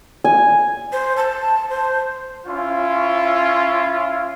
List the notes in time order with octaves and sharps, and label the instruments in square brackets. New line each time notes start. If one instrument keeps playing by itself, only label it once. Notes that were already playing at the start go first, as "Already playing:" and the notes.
[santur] G#5
[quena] C5
A5
C5
[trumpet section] C#4 E4 F4